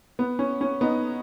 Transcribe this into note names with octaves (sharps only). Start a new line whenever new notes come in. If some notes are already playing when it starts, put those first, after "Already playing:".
B3
C#4
C#4
B3 D#4